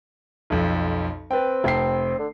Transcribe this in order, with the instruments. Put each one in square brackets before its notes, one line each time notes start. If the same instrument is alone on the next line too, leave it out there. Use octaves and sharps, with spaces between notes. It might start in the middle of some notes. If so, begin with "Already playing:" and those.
[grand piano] B1 F2
[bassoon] C4 [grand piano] B4 G5
[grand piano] F1 G5 C7
[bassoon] D3